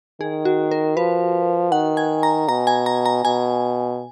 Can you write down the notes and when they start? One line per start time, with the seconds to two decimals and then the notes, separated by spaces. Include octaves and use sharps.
0.20 D#3 G#4
0.45 F#4
0.71 A#4
0.97 F3 B4
1.72 D#3 F#5
1.97 G#5
2.23 A#5
2.48 B2 A#5
2.67 G#5
2.86 A#5
3.06 A#5
3.25 B2 G#5